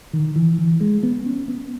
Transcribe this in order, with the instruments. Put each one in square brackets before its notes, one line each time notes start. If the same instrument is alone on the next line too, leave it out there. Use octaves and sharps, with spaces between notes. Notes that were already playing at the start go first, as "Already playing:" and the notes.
[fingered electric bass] D#3
E3
E3
G#3
B3
C#4
B3